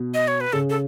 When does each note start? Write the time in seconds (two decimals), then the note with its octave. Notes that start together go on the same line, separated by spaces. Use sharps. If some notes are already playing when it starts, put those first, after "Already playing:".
Already playing: B2
0.14 D#5
0.28 C#5
0.40 B4
0.53 C#3 A4
0.70 A4